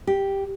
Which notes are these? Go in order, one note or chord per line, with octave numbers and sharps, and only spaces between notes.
G4